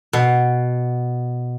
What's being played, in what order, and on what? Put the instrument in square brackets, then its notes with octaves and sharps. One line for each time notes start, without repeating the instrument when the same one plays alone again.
[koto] B2